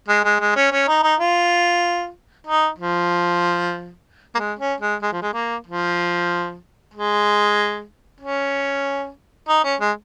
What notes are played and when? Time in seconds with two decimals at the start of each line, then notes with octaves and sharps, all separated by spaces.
0.08 G#3
0.24 G#3
0.40 G#3
0.56 C#4
0.72 C#4
0.88 D#4
1.03 D#4
1.20 F4
2.47 D#4
2.79 F3
4.35 A#3
4.39 G#3
4.59 C#4
4.81 G#3
5.02 G#3
5.12 F3
5.22 G#3
5.34 A#3
5.67 F3
6.94 G#3
8.21 C#4
9.49 D#4
9.64 C#4
9.81 G#3